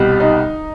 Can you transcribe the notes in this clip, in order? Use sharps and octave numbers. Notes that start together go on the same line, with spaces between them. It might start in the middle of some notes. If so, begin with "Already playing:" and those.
Already playing: C2 B2 G3
D#4